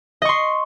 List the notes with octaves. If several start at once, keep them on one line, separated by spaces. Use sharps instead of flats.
D#5 C6 C#6